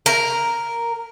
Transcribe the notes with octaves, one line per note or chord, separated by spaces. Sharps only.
A#4